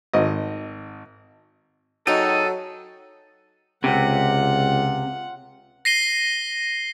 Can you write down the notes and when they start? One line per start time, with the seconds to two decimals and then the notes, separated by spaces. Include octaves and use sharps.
0.13 G#1 D#5
2.07 F#3 D#4 F#4 G#4 A4 D#5 G5
3.84 C#2 C3 F4 F#5
5.85 A#6 C7 D#7 G7